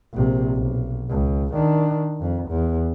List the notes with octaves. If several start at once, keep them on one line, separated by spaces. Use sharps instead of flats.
A#1 C3
B1
C#2
D#3 D4
F2
E2